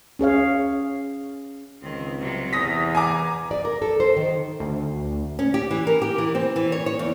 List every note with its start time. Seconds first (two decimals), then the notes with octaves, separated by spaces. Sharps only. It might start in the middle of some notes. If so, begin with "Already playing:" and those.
0.19 C#4 G#4 C#5 F5
1.82 C#2 D#3 C4
2.20 C3 F#3 G3
2.53 E2 E3 D#6 A#6 B6
2.95 G#5 A#5 D6
3.51 D5
3.65 A#4
3.82 A4
4.00 C5
4.17 D#3
4.60 D2
5.39 C#4
5.54 G4
5.71 E3
5.87 A#4
6.02 G4
6.18 E3
6.35 C4
6.56 E3
6.72 C#5
6.86 C#5
6.99 E2